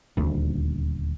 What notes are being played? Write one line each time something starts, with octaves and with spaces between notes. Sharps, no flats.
D#1 D2